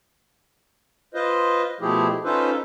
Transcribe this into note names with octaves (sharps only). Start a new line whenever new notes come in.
F4 B4 C5 D#5
B2 F3 A3 E4 G4 G#4
C#4 D#4 F4 A4 B4 C5